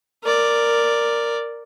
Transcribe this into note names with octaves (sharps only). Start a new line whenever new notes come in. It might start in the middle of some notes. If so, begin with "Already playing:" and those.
A#4 D5